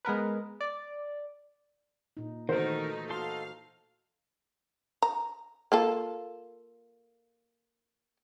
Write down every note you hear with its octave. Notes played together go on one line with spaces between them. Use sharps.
G#3 B3 A#4 B4
D5
A#2 D#4
D#3 E3 A3 D#4 F#4 A#4 C5
D#4 F#4 A4 F5 C6
A#5
A#3 F4 A4